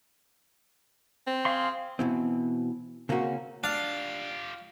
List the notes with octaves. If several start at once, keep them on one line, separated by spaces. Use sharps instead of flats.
C4
G#4 F5 C6
B2 E3 C4
C#3 A#3 C4 C#4 F#4
D4 F4 G4 F5